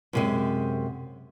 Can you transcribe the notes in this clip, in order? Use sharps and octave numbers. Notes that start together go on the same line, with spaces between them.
F#2 C3 G#3